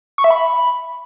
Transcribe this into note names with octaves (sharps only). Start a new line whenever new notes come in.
C#6
E5
B5